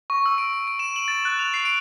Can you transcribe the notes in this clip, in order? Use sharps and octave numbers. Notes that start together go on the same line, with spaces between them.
C#6
E6
D7
D7
D7
E7
F#7
A6
F#6
F7
C7
D7